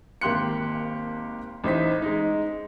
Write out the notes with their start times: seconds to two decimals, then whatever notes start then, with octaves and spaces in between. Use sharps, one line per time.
0.21 G#1 A#3 G4 C6 F#6 C#7
1.64 A1 D#4 C5 B6
2.02 G#3 D#4